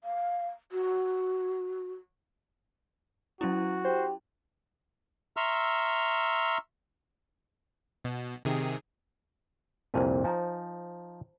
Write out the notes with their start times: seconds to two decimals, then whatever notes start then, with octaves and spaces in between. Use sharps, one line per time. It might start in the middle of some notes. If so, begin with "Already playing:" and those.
0.04 F5
0.72 F#4
3.41 F#3 C#4 E4 F#4
3.85 G4 C5
5.37 E5 A#5 C6 C#6 E6 F6
8.04 B2
8.45 C3 D#3 G#4
9.94 C2 F2 A#2 B4 C5 A5
10.24 F3 D#4 G#5 A#5